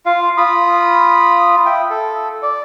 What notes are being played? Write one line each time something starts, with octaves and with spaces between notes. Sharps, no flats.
F4 F5
F4 B5 D#6
E5 G5
A4
D5